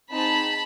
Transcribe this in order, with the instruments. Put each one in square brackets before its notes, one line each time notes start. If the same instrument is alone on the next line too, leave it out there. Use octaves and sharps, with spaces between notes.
[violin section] C4 D#4 G#4 A5 B5